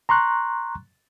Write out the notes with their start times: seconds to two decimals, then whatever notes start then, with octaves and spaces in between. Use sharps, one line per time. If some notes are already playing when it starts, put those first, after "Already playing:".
0.09 A#5 C6 C#6 F#6